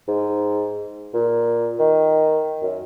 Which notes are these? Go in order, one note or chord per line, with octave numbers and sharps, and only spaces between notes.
G#2
A#2
D#3
F#2